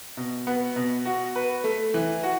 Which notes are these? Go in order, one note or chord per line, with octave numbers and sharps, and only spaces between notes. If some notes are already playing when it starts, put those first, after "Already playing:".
B2
B3
B2
F#4
B4
A3
E3
F#4